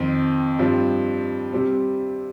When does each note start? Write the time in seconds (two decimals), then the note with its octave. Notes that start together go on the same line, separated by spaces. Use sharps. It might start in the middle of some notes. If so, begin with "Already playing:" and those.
Already playing: F2 D#3 C4
0.59 G2 F3 C4
1.53 C3 G3 C4